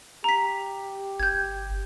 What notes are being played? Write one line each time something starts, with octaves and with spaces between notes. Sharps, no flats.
G4 A#5 B6
G1 G6 G#6